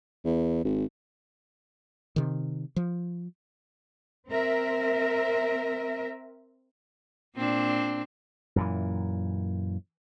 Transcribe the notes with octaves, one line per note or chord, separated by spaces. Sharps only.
E2
G#1
C3 D#3
F3
C4 A#4 E5
A#2 C4 D4
F#2 A#2 E3